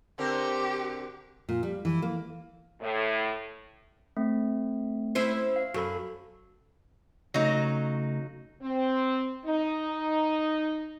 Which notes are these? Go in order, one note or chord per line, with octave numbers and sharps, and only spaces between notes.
D3 C4 G4 A#4
A#2
G3
E3
A#3
A2
A3 C4
C#4 E4 C5
F5
F#2 F#4 A4 B5
C#3 F#3 A3 D#4
C4
D#4